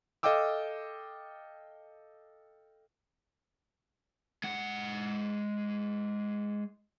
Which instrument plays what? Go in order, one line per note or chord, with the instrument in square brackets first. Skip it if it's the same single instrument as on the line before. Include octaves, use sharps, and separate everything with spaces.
[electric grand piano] A4 D#5 F5 G5 D6 E6
[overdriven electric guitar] G#3 F#5